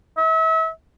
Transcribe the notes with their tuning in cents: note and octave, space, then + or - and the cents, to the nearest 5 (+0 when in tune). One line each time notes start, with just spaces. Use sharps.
E5 -35